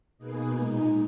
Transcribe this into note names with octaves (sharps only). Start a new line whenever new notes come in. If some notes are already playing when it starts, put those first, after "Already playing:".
B2 A#3 D#4 G#4 B4
A#2 G#3 D#4